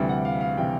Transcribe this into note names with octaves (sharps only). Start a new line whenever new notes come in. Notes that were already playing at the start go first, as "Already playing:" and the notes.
Already playing: D2 C3 E3 G3
F#5
F5
F5
C3 E3 G3 G5